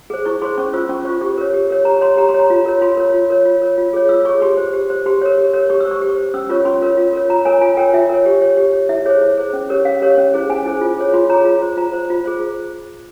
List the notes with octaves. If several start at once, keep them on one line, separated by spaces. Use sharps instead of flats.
G#4 C5
E4 C#6
G#4 C5 C6
C#4 C#6
F4 C5 E6
C#4 C#6
F4 C5 C#6
G4 C#6
A#4 C#5
G4
A#4 C#5
G4 A#5
C#5 C6
G4 A#5
C6
C#5
A#5
F4
A#4 C#5
F4 C6
A#4 C#5
F4
A#4 C#5
F4
A#4 C#5
F4
G#4 C#5
F4 E6
G#4 C#5 C#6
G4 C6
C5
G4
C5
G4 C6
A#4 C#5
G4
A#4 C#5
G4 C#6
E6
C5
C#6
G4
C5
C#4 E6
F4 A#4 C#5 C#6
C#4 C6
F4 A#4 C#5
F4
A#4 C#5
F4 A#5
A#4 C#5 G#5
F4 G#5
A#4 C#5 G5
F4 E5
A#4 C#5
G4
C#5
G4
C#5
E4 E5
G#4 C5 C#5
E4
G#4 C5
C#4
G4 A#4 C#5
C#4 F5
G4 A#4 C#5
C#4
E4 G#4 C5
C#4 G#5
E4 G#4 C5
F4
G#4 C#5
F4 C6
G#4 C#5 A#5
F4
C5
F4 A#5
C5
F4
G#4 C5